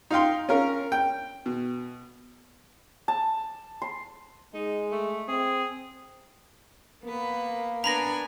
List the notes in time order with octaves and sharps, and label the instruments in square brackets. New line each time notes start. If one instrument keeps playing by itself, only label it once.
[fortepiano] D#4 F4 F5 G5 C6
C#4 F4 A#4
G5
B2
[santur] A5
C6
[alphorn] G#3 [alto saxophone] D#4
[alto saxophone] A3
[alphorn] C4 [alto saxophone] G#4
[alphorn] A#3 [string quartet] B3 B4
[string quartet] B3 D4 G#5 [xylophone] A#5 B5 A#6